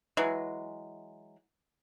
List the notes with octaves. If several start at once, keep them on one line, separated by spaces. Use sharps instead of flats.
E3 F#3 G#3